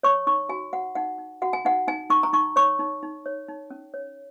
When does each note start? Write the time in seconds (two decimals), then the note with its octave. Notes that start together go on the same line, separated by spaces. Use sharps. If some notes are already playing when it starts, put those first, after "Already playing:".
0.03 C#5 C#6
0.27 D#4 C#6
0.49 F#4 G#5
0.72 F#4 F#5
0.95 D#4 F#5
1.18 D#4
1.42 F#4 F#5
1.53 G#5
1.65 D#4 F#5
1.88 D#4 G#5
2.10 D#4 C#6
2.23 A#5
2.33 D#4 C#6
2.56 C#5 C#6
2.79 D#4
3.03 D#4
3.26 C#5
3.49 D#4
3.70 C#4
3.94 C#5